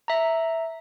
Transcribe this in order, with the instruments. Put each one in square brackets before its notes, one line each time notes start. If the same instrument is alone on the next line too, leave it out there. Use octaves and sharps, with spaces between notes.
[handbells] E5 A#5